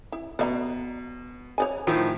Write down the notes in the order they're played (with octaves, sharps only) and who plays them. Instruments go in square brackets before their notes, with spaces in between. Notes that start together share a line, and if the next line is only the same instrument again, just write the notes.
[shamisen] E4
[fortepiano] B2 [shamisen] D5 E5 A#5
[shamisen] C#5 D5 G#5
[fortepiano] A2 D#3 F3